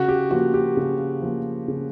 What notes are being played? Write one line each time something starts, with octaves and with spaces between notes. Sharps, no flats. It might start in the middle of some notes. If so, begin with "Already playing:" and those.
Already playing: C#3 F#4
G4
F3 A#3 F#4
G4
C#3
F3 A#3
C#3